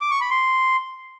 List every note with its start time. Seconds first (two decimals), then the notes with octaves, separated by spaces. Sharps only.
0.01 D6
0.11 C#6
0.21 B5
0.31 C6